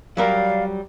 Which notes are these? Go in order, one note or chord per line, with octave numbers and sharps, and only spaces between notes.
F#3 G3 A#4 D5 F5